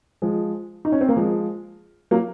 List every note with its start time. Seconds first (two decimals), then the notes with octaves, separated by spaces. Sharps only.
0.22 F3 G#3
0.85 D#4
0.92 C#4
1.01 C4
1.09 A#3
1.17 F3 G#3
2.11 F#3 A#3